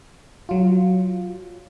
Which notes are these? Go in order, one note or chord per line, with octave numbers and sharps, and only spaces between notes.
F#3 F4